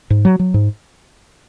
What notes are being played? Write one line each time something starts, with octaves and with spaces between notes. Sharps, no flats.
G#2
F#3
F#3
G#2